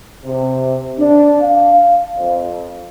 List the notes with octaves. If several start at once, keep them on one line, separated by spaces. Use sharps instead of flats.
C3
D4
F5
F2